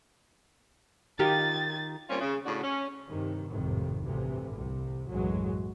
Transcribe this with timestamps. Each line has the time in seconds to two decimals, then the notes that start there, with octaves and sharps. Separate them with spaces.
1.19 D#3 F4 G4 A6
2.09 A#2 G3 C4 C#4 F4
2.21 C#3
2.46 A2 C#3 D4 F#4
2.63 C#4
3.08 G2 C3 D#3
3.49 G#1 F2 A2 C3 D#3
4.04 A1 D2 G2 C3 E3
4.54 C2 C3
5.07 B1 F#2 A2 E3 F#3 G#3